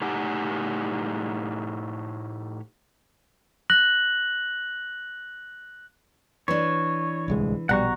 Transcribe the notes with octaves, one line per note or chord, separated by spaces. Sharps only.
A2 D#4 G4 F#5 G#5
F#6 A#6 F#7
E3 D4 C#5
D1 C2 G#3
A#1 B2 G3 F#5 A#5 C#6